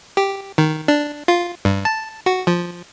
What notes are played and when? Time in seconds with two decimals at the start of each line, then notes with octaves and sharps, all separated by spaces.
0.17 G4
0.58 D#3
0.88 D4
1.28 F4
1.65 G2
1.85 A5
2.26 F#4
2.47 F3